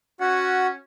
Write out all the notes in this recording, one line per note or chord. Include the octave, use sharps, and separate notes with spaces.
C#4 F#4 F#5